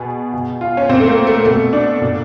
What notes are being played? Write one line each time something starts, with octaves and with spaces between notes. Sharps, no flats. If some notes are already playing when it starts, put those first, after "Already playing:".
Already playing: B2 G#4
B2
F4
C#4
A#2 C4
A3
A#3
A3
B2 A3
D4
A#2